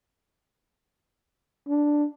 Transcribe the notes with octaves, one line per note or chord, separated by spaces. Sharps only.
D4